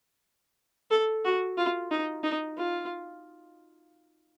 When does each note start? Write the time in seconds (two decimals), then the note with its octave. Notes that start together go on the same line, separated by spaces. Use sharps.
0.91 A4
1.25 F#4
1.58 F4
1.91 D#4
2.23 D#4
2.58 F4